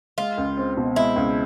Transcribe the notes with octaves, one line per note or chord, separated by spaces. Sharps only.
G#3 F4
C#2
C4
B2
G#3 E4
C#2